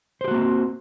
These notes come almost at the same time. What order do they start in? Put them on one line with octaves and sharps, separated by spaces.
C5 G4 F#4 A#3 C4